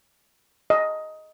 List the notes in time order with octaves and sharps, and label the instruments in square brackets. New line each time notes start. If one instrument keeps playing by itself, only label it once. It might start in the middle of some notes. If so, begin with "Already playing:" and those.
[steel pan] D#5